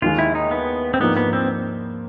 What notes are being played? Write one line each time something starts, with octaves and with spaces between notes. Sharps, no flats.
D#2 D#3 G#3 F4
E4
D#4
B3
C4
G#2 F3 A#3 B3 D4
B3
C4